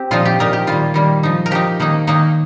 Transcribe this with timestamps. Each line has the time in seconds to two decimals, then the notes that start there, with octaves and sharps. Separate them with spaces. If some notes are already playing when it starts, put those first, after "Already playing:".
Already playing: C4 G4
0.11 A#2 F3 D#4 F4
0.25 G4
0.39 A#2 F3 D#4 A#4
0.53 G4
0.67 D#3 G3 A#3 F4
0.94 D#3 G3 A#3
1.23 F3 D#4
1.46 A#4
1.51 F3 D#4 G4
1.80 D#3 A#3 D#4
2.07 D#3 A#3 D#4